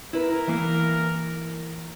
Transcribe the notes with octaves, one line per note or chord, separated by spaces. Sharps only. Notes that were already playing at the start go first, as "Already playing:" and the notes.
E4 A#4 B4
E3 A#3